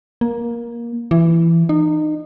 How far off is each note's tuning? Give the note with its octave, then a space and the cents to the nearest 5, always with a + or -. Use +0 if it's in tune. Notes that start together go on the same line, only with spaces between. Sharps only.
A#3 +15
E3 +15
D#4 -30